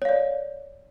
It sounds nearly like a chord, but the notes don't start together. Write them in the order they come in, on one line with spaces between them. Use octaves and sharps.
C#5 F5 D5